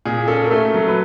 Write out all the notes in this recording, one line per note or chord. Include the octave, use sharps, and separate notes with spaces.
A#2 G#4
C#4 A4
A#4
A3 A4
F#3
B4